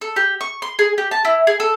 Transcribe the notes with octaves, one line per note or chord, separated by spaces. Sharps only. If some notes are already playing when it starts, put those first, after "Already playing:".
A4
G4
C#6
C6
G#4
G4
A5
E4
G#4
A4